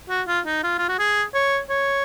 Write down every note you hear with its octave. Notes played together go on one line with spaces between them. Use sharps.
F#4
F4
D#4
F4
F4
F#4
G#4
C#5
C#5